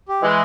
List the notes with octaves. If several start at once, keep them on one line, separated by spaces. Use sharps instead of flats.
G4
E3 G#3 D#5